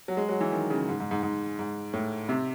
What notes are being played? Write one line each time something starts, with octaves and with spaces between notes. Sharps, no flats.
F#3
G#3
F#3
E3
D#3
C#3
G#2
G#2
G#2
G#2
G#2
A2
C3